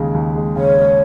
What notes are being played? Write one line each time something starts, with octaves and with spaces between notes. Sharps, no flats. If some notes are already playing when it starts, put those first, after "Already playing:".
Already playing: D#2 C#3 G#3
D#2
G#3
C#3 C#5
G#3